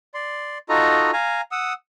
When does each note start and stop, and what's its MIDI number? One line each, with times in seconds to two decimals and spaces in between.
0.14 0.58 74
0.14 0.58 84
0.69 1.11 63
0.69 1.11 65
0.69 1.11 66
0.69 1.11 69
0.69 1.11 75
0.69 1.11 82
1.13 1.41 77
1.13 1.41 80
1.13 1.41 82
1.52 1.73 78
1.52 1.73 87
1.52 1.73 88